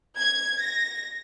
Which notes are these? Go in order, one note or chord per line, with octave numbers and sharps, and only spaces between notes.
G#6
A#6